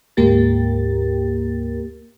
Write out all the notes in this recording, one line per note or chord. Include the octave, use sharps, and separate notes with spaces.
D2 G#2 A#3 G4 A#4 A6